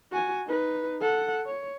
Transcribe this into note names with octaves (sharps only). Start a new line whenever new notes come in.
F#4 G#5
D#4 B4
A4 F#5
C#5